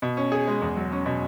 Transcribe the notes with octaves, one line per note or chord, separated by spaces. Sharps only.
B2
C#4
G#4
G#3
E2
F#3
C#4
B2